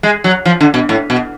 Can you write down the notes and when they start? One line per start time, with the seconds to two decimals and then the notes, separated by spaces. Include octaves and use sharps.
0.03 G#3
0.24 F#3
0.45 F3
0.61 D3
0.74 B2
0.89 A2
1.10 B2